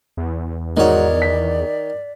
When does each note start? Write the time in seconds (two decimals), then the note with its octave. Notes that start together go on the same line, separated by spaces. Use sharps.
0.17 E2
0.77 G#2 D#3 F#4 C#5 D5
1.22 B6